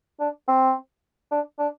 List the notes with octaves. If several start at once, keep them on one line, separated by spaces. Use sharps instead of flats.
D4
C4
D4
D4